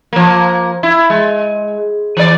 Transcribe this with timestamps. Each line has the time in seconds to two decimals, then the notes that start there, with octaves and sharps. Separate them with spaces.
0.13 F3 A#3
0.83 E4
1.10 G#3
2.17 E3 D5